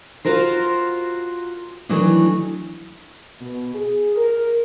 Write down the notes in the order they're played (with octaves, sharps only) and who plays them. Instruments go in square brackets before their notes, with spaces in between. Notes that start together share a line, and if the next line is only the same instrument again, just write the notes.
[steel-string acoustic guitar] F4 F#4 A#4 C5
D#3 E3 F#3 A3 D4
[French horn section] B2
G#4
A#4